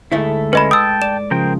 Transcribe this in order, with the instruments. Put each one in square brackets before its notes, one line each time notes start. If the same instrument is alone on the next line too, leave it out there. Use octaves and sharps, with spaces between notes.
[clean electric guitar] D2 A4 E5 [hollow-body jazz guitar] G#2 A3 E4
[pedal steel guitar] G#3 C#4 [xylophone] B4 D#5 B5
[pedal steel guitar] G5 A5 [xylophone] D#6 E6
[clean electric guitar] D5 [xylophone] E7
[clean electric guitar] C#3 F3 G#3 [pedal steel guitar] A#4 C5 G5